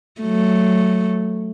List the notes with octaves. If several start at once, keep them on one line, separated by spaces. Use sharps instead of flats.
F#3 A3